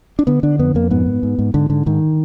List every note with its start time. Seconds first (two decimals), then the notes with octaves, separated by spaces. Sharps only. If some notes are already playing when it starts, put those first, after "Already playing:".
0.19 D4
0.27 D3 B3
0.43 D3 D4
0.59 F2 B3
0.75 F2 A#3
0.91 G#2 B3
1.06 G#2
1.23 G#2
1.39 G#2
1.54 G#2 D3
1.70 G#2 D3
1.86 G#2 D#3